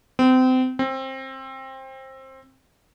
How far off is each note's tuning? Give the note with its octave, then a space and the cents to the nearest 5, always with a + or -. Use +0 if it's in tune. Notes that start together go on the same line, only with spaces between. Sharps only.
C4 -30
C4 +20